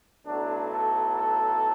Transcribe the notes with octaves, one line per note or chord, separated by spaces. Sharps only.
B1 A2 F#3 A3 D4
A4
A4